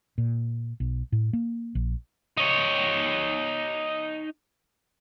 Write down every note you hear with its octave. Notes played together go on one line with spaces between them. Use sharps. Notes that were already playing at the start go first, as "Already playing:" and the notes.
A#2
B1
A2
A#3
A#1
D#4 C#5